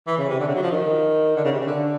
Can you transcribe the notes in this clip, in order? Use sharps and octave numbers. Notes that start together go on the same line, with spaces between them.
E3
C#3
C3
D3
C#3
F#3
F3
D#3
D3
C#3
C3
C#3
D3